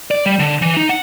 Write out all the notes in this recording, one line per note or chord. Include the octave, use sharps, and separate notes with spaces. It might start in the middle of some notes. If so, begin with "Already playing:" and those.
D5
G3
D3
E3
D#4
F#5